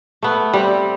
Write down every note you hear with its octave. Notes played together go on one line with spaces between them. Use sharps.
A3 B3
G3 C4